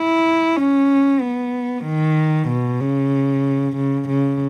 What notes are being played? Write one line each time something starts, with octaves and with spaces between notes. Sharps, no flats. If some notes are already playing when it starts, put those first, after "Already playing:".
Already playing: E4
C#4
B3
D#3
B2
C#3
C#3
C#3